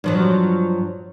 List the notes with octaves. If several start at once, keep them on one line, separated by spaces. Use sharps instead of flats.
G2 F3 F#3